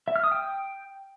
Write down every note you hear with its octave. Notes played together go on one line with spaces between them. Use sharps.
E5
F6
D#6
G5